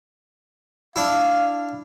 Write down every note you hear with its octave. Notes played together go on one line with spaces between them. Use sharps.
D4 E4 F5